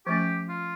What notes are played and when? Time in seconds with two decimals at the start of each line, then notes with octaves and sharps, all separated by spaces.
0.07 F3 A3 C#4 G4
0.48 F4